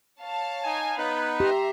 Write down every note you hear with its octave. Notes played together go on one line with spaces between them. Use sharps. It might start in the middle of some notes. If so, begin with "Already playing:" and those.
C#5 F5 A5
D#4 G#5
B3 D#4 B4 B5
G4 E5 A#5 C6